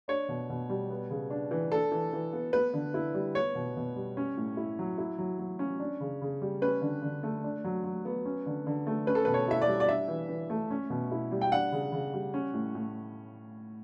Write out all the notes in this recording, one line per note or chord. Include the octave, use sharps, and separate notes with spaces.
D4 C#5
B2
B2
G3
B3
C#3
D4
E3
D4 A4
E3
E3
B3
B3 B4
D3
E4
G3
B3 C#5
B2
B2
G3
C#4
A2
E4
F#3
E4
F#3
F#3
C#4
D4
C#3
C#3
G3
C#4 B4
D3
D3
A3
D4
F#3
F#3
B3
C#4
D3
D3
A3
C#4 B4
A4
B2 B4
C#5
E4 E5
D5
G3
D5
D4 E5
E3
E3
A3
C#4
B2
E4
G3
G5
D4 F#5
C#3
C#3
G3
C#4
A2
A2